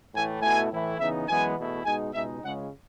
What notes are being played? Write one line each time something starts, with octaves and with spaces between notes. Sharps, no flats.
A2 E3 A3 G#5
B2 A3 E4 G#5
A2 E3 A3 E4
C#3 E3 B3 D#4 E5
F#2 E3 G#3 B3 G#5
E2 B2 A3 E4
B2 G#3 D#4 G#5
C#2 B2 G#3 D#4 E5
C#2 C#3 G#3 C#4 F#5